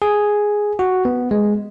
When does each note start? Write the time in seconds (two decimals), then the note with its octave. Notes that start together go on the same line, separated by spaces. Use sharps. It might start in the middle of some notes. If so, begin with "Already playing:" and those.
0.02 G#4
0.79 F#4
1.05 B3
1.31 G#3